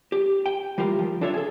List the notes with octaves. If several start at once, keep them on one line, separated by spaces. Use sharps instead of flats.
G4
G5
E3 G3 F4 G4 A#4
D#2 F3
D4 F4 A4 C#5 E5
G#4 A4